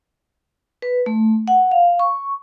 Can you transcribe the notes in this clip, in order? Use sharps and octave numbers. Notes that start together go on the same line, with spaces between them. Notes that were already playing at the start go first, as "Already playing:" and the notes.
B4
A3
F#5
F5
C#6